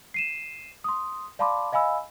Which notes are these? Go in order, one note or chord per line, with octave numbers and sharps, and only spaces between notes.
C7 D#7 E7
C6 D#6
D5 F5 A5 B5 C6 D6
D#5 F5 G#5 B5 E6